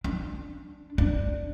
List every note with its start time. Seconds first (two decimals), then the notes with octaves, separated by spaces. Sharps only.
0.04 D4
0.98 D4